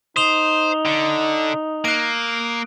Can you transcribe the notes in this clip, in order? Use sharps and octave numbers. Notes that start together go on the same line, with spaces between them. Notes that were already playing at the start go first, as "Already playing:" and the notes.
D#4 C5 D#6 F7 G7
D3
A#3 F#6 D7